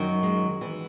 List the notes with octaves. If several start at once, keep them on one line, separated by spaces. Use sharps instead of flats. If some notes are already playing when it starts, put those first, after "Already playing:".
Already playing: F#2 D#3 F#3
G#3
E3